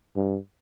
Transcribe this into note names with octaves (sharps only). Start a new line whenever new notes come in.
G2